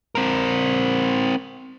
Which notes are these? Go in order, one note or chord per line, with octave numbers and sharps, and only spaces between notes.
C4 A#4